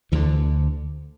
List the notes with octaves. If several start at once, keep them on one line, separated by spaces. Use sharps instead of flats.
D2 D3 E3